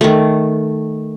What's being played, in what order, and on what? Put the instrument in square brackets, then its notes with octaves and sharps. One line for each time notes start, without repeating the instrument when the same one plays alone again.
[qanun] D#3 A3